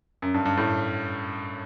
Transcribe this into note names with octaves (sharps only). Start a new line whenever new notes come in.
F#2
G2
G2
A2